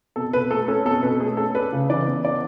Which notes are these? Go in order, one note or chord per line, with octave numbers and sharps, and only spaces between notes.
B2 A4
B2 B4
A3 A4
C#4 A4
B2 A4
B2 B4
A3 G#4
C#4 A4
D4 B4
C#3
E3 D5
B3
D4 D5